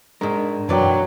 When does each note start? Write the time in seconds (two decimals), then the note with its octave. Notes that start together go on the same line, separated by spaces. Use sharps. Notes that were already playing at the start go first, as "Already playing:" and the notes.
0.21 G#2 G#3 D4 A#4
0.69 B1 F#2 E3 F#3 B4 D5 G5